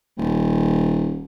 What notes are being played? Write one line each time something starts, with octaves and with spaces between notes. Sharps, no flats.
D#1